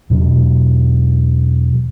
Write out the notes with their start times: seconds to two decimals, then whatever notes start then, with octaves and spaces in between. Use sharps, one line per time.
0.10 E2 B2 F#3